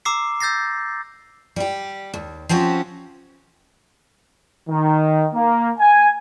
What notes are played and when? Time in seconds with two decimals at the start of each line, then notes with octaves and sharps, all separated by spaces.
0.05 A#5 D6 E6 C7
0.41 E6 G6 A6 A#6 C7
1.56 G3 G4
2.14 D#2
2.49 F3 C4 C#4 F#4 G4
4.69 D#3
5.34 A#3
5.78 G#5